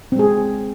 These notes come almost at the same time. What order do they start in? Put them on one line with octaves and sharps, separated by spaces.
C4 G#3 G#4